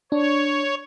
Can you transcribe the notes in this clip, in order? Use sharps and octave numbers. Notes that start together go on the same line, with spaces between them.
D4 C#5